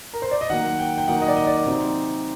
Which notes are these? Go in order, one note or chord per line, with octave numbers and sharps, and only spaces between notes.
A#4
C5
D5
D#5
D#3 F#3 A#3 F#5
G5
G5
D#3 F#3 A#3 D#4 F#5
D#5
D5
D#5
D5
C3 F#3 C4 D#4